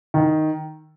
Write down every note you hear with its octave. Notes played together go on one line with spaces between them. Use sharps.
D#3